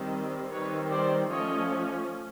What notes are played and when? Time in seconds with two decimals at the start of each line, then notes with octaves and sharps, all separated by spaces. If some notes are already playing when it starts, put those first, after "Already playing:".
Already playing: D#3 G3 C4
0.52 D#3 G3 C4 B4 C#5
0.90 C5 D5
1.30 F3 A3 C#4 C#5 D#5